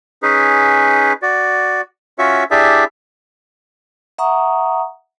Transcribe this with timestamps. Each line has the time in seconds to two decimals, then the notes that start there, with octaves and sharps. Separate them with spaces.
0.23 C#4 D#4 G#4 B4
1.22 F#4 D5
2.19 C#4 F4 F#4 C#5 E5 C#6
2.51 D4 E4 G4 G#4 D5 E5
4.18 E5 F#5 A#5 C#6 D#6